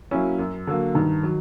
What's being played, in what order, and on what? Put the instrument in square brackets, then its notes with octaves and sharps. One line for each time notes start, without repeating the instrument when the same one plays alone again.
[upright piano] F#3 A#3 C#4 E4
F#2
D3 F#3 A#3
[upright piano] G2 [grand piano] D#3 D#4
[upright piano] F#3